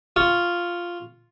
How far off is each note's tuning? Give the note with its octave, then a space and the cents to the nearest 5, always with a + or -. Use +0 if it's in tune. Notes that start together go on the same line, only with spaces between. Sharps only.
F4 +0 C#6 +0